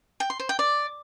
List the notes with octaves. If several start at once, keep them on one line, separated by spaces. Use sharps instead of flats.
G5
C6
C5
G5
D5